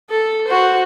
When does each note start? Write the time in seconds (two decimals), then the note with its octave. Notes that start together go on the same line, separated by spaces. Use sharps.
0.10 A4
0.48 F#4 C5